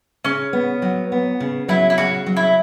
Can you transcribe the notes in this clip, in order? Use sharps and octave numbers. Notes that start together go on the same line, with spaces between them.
C#3 C#4
B3
F#3
B3
C#3
F#3 E4
E4
C#3 F#4
F#3
E4